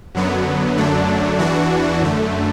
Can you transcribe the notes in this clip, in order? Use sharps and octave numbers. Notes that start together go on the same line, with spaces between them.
F#2 D3 F#3 B3
F#2 D3 F#3 A3 D4
E2 E3 D4 F#4
F#2 D3 A3